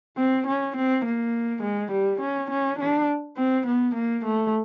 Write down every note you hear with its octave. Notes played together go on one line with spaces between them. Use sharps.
C4
C#4
C4
A#3
G#3
G3
C#4
C#4
D4
C4
B3
A#3
A3